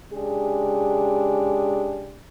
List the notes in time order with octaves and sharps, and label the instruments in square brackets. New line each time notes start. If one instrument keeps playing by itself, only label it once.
[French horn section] C#3 G#3 D4 G4 G#4